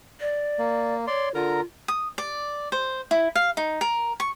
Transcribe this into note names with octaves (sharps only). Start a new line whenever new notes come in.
D5
A#3
C#5 D5 C6
D3 F4 A#4 A#5
D#6
D5
C5
E4
F5
D#4
A#4
C#6